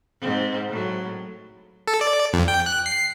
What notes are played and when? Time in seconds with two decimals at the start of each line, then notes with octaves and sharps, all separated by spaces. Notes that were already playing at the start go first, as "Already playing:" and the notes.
0.20 G#2 C4
0.68 A2 F#3
1.88 A4
2.01 D5
2.33 F2
2.48 G5
2.66 F#6
2.86 C7